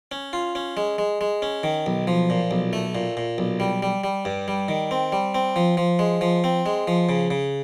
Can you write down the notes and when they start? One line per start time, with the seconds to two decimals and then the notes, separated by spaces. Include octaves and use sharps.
0.12 C#4
0.33 F4
0.55 C#4
0.77 G#3
0.98 G#3
1.21 G#3
1.42 C#4
1.63 D#3
1.86 B1
2.07 F3
2.30 A#2
2.51 B1
2.73 A3
2.95 A#2
3.17 A#2
3.38 B1
3.60 G3
3.82 G3
4.04 G3
4.25 G2
4.48 G3
4.68 D#3
4.91 C4
5.12 G3
5.35 C4
5.56 F3
5.77 F3
5.99 G#3
6.21 F3
6.44 C4
6.66 G#3
6.87 F3
7.09 C#3
7.31 C#3